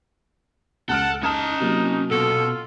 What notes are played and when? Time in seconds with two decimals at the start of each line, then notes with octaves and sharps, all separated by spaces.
0.89 C#2 A4 F#5 F6 D7
1.23 C#4 D#4 A5 D#6 F6 E7
1.60 C3 F#3 A#3
2.11 B2 F4 A4